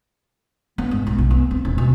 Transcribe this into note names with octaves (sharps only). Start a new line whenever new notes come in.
B3
G#2
B1
B1
B3
C4
D#1
B2